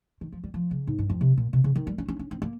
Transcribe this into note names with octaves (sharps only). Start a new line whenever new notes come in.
D#3
F3
G3
F3
C#3
G#2
G2
F2
C3
A#2
C3
C#3
D#3
G3
C#4
C#4
C#4
C4
A#3